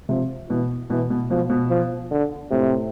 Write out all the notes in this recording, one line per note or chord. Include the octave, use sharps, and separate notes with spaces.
C3 F3
B2 E3
B2 E3
B2
B2 F3
B2
F3
D3
A2 C3